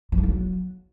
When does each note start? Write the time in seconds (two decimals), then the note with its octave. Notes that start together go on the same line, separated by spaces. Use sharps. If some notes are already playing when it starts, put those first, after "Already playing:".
0.12 F3
0.18 E2
0.23 E3
0.29 F#3